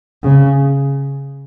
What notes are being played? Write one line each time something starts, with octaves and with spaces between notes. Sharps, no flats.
C#3